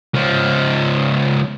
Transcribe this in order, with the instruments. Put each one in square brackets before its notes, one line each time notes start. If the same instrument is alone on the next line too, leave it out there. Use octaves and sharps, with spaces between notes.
[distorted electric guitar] C#2 F3